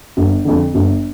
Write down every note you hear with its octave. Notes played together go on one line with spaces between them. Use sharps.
G1
F2 D3
G1